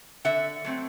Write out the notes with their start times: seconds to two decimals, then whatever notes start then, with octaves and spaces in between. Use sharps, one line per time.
0.25 D3 E5 F#5
0.64 F#3 A3 C4